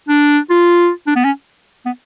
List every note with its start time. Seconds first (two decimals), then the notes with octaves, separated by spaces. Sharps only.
0.09 D4
0.50 F4
1.07 D4
1.16 B3
1.25 C#4
1.86 B3